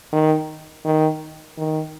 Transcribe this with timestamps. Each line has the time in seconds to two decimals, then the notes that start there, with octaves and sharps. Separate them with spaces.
0.13 D#3
0.85 D#3
1.58 D#3